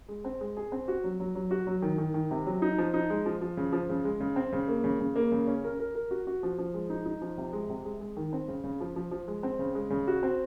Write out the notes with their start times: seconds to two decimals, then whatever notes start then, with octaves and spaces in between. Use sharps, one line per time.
0.08 G#3
0.25 C4
0.41 G#3
0.57 G#4
0.72 C4
0.88 F#4
1.04 F#3
1.20 F#3
1.35 F#3
1.51 F#4
1.67 F#3
1.82 D#3
1.98 D#3
2.14 D#3
2.31 C3
2.46 F#3
2.62 D#4
2.78 F3
2.94 D#4
3.10 G#3
3.26 F3
3.41 F3
3.57 C#3
3.72 F3
3.89 C#3
4.05 G#3
4.20 C#3
4.36 C4
4.53 C#3
4.68 A#3
4.84 C#3
5.00 C#3
5.16 A#3
5.32 C#3
5.47 C#4
5.64 A#4
5.79 A#4
5.95 A#4
6.11 F#4
6.27 F#4
6.43 F3
6.58 F3
6.74 G#3
6.90 D#4
7.06 D#4
7.22 F3
7.38 C3
7.53 G#3
7.69 C3
7.85 G#3
8.01 G#3
8.17 D#3
8.33 C4
8.48 C#3
8.64 C#3
8.81 F3
8.96 F3
9.11 F3
9.28 G#3
9.43 C4
9.59 C#3
9.75 G#3
9.90 C#3
10.07 F#4
10.23 C4